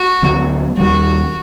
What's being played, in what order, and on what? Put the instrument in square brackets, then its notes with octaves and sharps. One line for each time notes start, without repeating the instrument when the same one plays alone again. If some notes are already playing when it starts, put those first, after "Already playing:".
Already playing: [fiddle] F#4
[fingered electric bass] D2 D3 F#3 B3
[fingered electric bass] D#2 D#3 G3 [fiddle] F#4